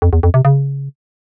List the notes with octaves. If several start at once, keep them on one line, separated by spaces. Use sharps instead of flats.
F2
E2
F2
C3
C#3